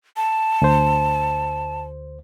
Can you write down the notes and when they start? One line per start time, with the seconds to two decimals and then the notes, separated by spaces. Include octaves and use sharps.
0.17 A5
0.62 D2 C5